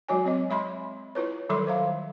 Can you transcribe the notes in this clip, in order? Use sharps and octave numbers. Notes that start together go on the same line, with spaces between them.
F#3 G#3 F#4 C#5 G#5
C4 C#5 D#5
G#3 E5 B5 C6
E4 F4 B4 C#5
D#3 F#3 G3 A4 E5 C6
C5 E5 F5